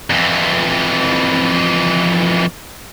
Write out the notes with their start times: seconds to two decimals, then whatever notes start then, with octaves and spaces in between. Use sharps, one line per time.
0.10 F2 E3